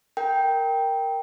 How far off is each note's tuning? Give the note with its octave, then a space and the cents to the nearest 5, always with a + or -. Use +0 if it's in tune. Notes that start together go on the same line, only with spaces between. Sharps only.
A#4 +0 G5 +0